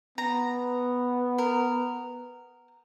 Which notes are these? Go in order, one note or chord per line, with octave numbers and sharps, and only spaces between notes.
B3 A#5
A#4